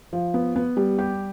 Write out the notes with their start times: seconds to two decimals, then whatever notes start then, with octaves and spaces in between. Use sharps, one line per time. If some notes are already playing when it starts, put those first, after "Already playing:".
0.13 F3
0.34 B3
0.56 B3
0.77 G3
0.98 G4